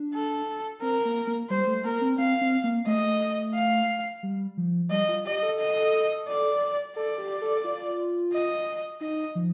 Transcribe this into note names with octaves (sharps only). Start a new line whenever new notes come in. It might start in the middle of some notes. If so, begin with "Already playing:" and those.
Already playing: D4
A4
C4 A#4
A#3
A#3
G3 C5
A3
A#3 A#4
C4
C4 F5
C4
A#3
A3 D#5
F5
G3
F3
G3 D#5
F4
G4 D#5
A4
D#5
D5
A4 D5
G4
A4
F4
D#5
D#4 D#5
F3